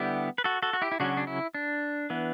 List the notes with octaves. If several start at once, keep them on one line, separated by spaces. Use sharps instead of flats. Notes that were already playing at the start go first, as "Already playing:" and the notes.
Already playing: D3 G3 B3 E4 G4
B4
F#4 A4
F#4 A4
F#4
E4 G4
E4
C#3 F#3 C#4 D4 F#4
D4
E4
D4
E3 B3